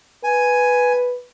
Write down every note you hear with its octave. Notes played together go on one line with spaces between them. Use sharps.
B4 G#5